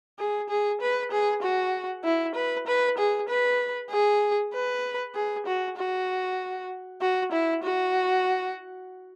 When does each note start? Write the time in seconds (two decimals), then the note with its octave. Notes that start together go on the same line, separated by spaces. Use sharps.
0.19 G#4
0.50 G#4
0.81 B4
1.12 G#4
1.43 F#4
2.04 E4
2.36 B4
2.67 B4
2.98 G#4
3.29 B4
3.91 G#4
4.54 B4
5.15 G#4
5.47 F#4
5.77 F#4
7.01 F#4
7.32 E4
7.63 F#4